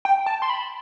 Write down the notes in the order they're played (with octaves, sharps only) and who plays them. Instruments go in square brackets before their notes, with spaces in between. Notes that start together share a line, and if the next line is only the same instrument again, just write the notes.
[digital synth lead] G5
A5
C6
B5